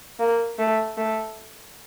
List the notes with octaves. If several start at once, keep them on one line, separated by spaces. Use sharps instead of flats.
A#3
A3
A3